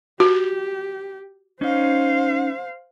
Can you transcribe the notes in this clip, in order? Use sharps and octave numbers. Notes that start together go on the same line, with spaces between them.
F#4 G4
C#4 D#4 C5 F5